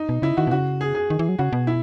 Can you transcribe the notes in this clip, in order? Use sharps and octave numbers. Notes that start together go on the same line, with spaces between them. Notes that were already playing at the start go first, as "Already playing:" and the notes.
Already playing: D#4
B2
C#3 E4
D#3 F#4
B2
C#3 F#4
G#4
G#4
D#3
E3
F#3
C#3 F#4
B2
E4